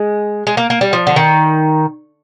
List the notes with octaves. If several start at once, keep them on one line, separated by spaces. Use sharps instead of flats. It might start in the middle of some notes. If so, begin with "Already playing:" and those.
Already playing: G#3
G#3
A#3
A#3
G3
F3
D3
D#3